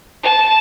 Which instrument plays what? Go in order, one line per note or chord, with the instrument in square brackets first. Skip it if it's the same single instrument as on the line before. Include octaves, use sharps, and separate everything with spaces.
[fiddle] A5